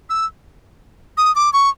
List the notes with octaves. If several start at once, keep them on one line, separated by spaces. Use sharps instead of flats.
E6
D#6
D6
C#6